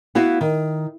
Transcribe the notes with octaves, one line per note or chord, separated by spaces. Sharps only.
B3 E4 F#4 F5
D#3